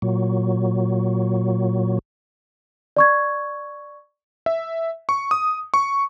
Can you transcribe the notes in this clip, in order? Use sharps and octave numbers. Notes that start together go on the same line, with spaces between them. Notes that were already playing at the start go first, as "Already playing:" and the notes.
A#2 F#3
D5 C#6 G#6
E5
C#6
D#6
C#6